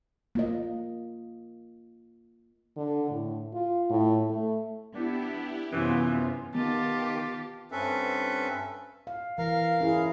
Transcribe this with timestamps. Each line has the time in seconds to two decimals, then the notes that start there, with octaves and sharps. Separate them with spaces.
0.35 A#3 F4 D#5
2.77 D3
3.11 A2
3.53 F4
3.90 A2
4.29 A3
4.95 B3 D4 E4 G4
5.73 F#2 C3 E3 B3 C#4 F4
6.54 D#3 B3 F4 G4 A5
7.72 G2 C4 C#4 A4 B4 E5
9.07 F5
9.38 E3 A#4 F5
9.80 C#4 E4 G#4